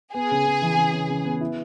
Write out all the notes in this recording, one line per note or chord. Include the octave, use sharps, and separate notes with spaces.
B3 G#4
C#3
C#3
E3
C#3
C#3
C#3
B3
E4